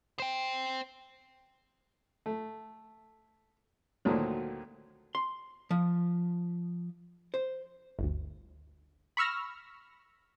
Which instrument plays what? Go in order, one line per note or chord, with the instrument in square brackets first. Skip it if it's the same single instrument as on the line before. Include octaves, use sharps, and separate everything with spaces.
[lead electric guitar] C5 G5
[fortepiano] A3
D2 A#2 D#3 F3 F#3
[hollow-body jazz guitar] C6
F3
C5
[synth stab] G1 D2
B5 C#6 E6 F6 A#6